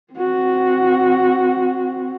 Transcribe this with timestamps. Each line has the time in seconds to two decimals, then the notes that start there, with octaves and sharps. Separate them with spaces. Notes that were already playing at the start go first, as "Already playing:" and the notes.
0.13 C4 F#4